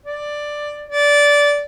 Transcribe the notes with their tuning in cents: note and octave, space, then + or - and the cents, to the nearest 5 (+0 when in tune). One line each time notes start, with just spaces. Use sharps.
D5 +5
D5 -15